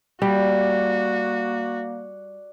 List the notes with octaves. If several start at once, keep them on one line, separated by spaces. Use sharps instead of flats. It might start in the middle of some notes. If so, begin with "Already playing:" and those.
G3 A#3 F#4 D5